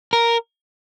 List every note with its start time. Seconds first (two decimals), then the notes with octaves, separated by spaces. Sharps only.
0.13 A#4